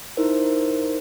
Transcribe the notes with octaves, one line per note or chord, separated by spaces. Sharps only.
D#4 E4 A#4 C5